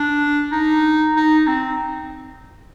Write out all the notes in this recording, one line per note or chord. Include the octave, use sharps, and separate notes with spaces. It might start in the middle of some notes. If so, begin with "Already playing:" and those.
Already playing: D4
D#4
D#4
C4